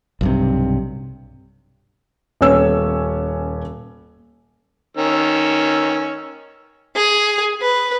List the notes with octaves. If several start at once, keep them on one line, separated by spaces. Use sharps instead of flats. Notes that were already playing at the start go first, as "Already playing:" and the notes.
B1 G2 C3
D#1 B3 C#4 C#5 E6
D#3 C#4 E6
G#4
B4